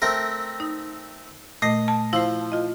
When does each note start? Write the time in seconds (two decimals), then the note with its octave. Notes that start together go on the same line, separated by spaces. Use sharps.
0.02 A3 C4 A#4
0.60 D#4
1.62 A#2 A3 D#5
1.88 A5
2.13 F3 E4 C5
2.52 F4 D#5